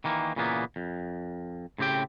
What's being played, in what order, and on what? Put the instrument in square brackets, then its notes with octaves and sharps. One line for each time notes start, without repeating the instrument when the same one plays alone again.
[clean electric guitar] D#3 E3 A#3
A#2 C#3 E3 A#3 B3
F2
A2 C#3 C4 G4 G5